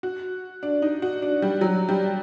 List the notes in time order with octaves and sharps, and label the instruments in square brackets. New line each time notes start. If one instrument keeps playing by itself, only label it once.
[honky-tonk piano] F#4
D4
D#4
F#4
D4
G3
F#3
G3